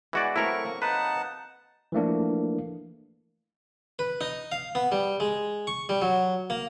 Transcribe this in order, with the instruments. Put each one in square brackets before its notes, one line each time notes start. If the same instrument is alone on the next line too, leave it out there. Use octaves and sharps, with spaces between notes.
[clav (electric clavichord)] E3 F#4 D5 [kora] G#3 B3
[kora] F#3 A3 C4 [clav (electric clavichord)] E4 A#4 [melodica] C#6
[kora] A#3
[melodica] D#4 F#5 A5 [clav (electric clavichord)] B4
[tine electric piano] E3 F3 A3 A#3 D4
[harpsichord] B4
D#4
F5
B3
G3
G#3
C#6
G3
F#3
A#3